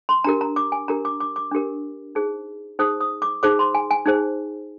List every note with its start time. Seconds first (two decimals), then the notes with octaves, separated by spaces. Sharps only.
0.09 C6
0.24 D4 G4 A#4 A#5
0.41 A#5
0.56 D6
0.72 G#5
0.88 D4 G4 A#4 A#5
1.05 D6
1.20 D6
1.36 D6
1.51 D4 G4 A#4
2.15 D#4 G#4 C5
2.79 D#4 G#4 C5 D#6
3.01 D#6
3.22 D6
3.43 D#4 G#4 C5 D6
3.59 C6
3.75 G#5
3.91 G#5
4.06 D#4 G#4 C5